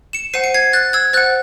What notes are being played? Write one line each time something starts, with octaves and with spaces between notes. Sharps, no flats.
C#7 E7
C5 F#5 C7 D#7
C#7
G#6 C7
F#6 A6
E6 G#6
C5 F#5 F#6 A6